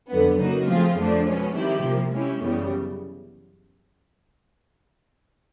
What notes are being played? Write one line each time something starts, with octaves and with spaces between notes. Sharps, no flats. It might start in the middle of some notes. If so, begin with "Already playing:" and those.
F2 D3 F#3 B3
C#3 F#3 A#3 D#4 F#4
F3 A3 C4 F4 G#4
F2 D3 F3 A3 D4
B2 G#3 C#4
D#3 G3 C4 E4 G4
C3 F3 A#3
G#3 C#4 E4 G4
F#2 C#3 E3 G3 B3